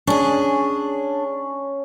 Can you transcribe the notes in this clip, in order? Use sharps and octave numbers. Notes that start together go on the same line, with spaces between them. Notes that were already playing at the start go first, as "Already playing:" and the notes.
C#4 D4 G#4